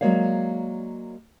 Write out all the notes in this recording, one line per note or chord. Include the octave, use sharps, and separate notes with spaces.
F#3 G#3 A#3 C#5 D5 F5